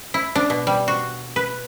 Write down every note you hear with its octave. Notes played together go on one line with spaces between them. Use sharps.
E4
D4
B2
G3
F#4
B4